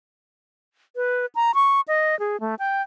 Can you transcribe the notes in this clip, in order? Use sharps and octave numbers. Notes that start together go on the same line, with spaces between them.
B4
A#5
C#6
D#5
G#4
A3
G5